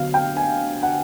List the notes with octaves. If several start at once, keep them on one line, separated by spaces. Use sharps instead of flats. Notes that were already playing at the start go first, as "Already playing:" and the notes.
Already playing: D3 F#3 B3 F5
G5
G#5
F#5